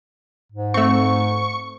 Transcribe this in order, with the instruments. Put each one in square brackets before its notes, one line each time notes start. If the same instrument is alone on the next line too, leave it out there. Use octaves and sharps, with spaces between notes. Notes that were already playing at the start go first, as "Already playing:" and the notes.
[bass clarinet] G#2
[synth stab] A3 C4 [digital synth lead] C#6